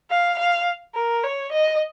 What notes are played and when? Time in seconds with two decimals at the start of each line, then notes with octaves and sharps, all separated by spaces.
0.10 F5
0.39 F5
0.95 A#4
1.24 C#5
1.52 D#5